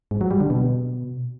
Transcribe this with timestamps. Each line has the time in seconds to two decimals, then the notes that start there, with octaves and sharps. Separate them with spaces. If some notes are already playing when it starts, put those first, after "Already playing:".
0.11 G#2
0.21 F#3
0.31 G3
0.40 D3
0.50 B2